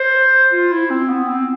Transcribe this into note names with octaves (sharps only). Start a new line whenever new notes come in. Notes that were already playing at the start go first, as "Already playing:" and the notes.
Already playing: C5
F4
E4
C4
B3
C4